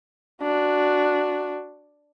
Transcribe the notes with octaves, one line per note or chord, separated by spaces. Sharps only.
D4 F#4